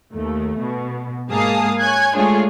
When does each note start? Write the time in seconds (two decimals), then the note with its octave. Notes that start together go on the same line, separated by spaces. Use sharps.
0.13 D#2 A3
0.60 B2
1.30 G#2 A#3 G#4 F5 A5 D#6
1.79 C#5 G#5 F#6 G#6
2.16 G#3 A3 D4 F4 G#4 C#5